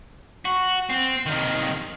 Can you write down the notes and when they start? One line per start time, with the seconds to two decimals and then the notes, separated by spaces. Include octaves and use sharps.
0.45 F#4
0.90 C4
1.26 C3 D#3